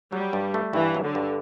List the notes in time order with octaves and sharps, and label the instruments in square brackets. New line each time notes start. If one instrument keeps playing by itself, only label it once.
[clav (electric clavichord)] F#3 [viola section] G3
[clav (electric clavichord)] G2
A3
[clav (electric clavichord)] G2 [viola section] E3
[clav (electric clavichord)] F#3
[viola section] D3
[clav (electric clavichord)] G2